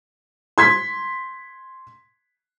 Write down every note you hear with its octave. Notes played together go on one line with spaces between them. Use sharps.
C6 G#6 B6